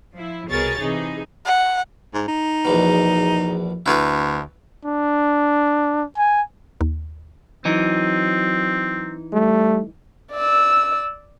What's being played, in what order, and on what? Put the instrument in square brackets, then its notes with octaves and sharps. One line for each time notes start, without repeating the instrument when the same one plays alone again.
[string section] F3 E4
C2 B2 G#4 A#4 C#5 A6
C3 E3 D#4 G#4
[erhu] F#5
[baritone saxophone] G#2
D#4
[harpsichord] A#1 E2 B2
[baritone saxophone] D2 [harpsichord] E4 B4 A#5
[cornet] D4
G#5
[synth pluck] D#2
[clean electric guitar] E3 D#4 [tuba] F#3 [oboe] C4
[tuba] G3 [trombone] A3
[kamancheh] D5 E6